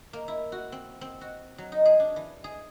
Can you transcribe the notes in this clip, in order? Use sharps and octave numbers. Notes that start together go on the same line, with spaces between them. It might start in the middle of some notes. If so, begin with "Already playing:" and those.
A#3
E4
F#4
C4
C4
F#4
F#3
D#4
G#4
D4
E3
G#4